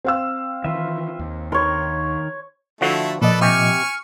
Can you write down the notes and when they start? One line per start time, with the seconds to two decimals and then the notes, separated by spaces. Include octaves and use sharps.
0.05 C4 F5 E6
0.64 D#3 E3 F4 B4 E5
1.19 D#2
1.52 D#3 A#4 C#5 C6
2.81 D3 F3 A3 E4 F#4
3.22 A#2 F3 A4 B4 D5 D#5
3.41 C3 G4 G#5 C#6 F6